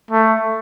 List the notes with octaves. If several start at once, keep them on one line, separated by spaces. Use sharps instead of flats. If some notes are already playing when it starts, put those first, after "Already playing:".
A3